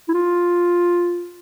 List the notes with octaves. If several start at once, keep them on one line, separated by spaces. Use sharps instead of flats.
E4
F4